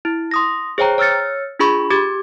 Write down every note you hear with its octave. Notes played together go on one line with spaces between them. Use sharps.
E4
C6 D#6 A#6
G#4 C5 C#5 G5 A#5
C#5 E6 F6 A6 C#7
D4 F4 G#4 B5 C#6
G4 D6 G#6